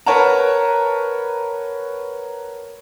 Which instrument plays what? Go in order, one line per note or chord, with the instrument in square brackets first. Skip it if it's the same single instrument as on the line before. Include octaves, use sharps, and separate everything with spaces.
[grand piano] A#4 B4 C#5 F#5 A5 A#5